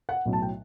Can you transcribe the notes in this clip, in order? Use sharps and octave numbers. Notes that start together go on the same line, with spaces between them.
F#5
B1 A2 F#3
A5
G5